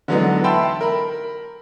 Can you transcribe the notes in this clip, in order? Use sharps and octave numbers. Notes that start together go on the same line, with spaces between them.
D3 E3 F#3 G#3 B3 D#4
E5 G5 A5 B5 C6 E6
A#4 B5